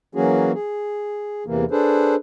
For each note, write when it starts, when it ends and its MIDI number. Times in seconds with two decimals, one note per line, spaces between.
0.15 0.52 52
0.15 0.52 54
0.15 0.52 58
0.15 0.52 61
0.15 0.52 66
0.15 0.52 68
0.53 1.44 68
1.46 1.65 40
1.46 1.65 48
1.46 1.65 52
1.46 1.65 58
1.71 2.15 62
1.71 2.15 68
1.71 2.15 69
1.71 2.15 71
1.71 2.15 72